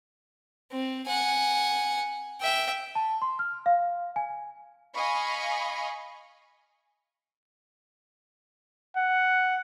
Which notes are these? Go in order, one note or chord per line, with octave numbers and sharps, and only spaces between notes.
C4
F#5 G#5
E5 G5
A5
C6
F6
F5
G#5
D#5 F5 G#5 B5 C#6
F#5